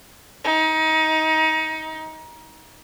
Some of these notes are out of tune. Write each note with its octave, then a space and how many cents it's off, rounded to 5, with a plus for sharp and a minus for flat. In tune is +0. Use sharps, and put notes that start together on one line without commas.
D#4 +25